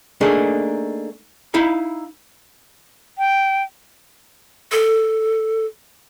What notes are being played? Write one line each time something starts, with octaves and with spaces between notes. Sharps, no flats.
A3 A#3 D4 D#4 G#4
D#4 E4 F5 B5
G5
A4